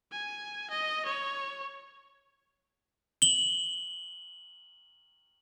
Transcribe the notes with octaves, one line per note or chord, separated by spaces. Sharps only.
G#5
D#5
C#5
F#7 G7